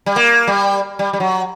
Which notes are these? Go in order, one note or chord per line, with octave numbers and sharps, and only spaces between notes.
G3
A#3
G3
G3
G3
F#3